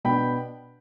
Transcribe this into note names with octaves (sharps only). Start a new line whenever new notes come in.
B2 B3 D4 G5 B5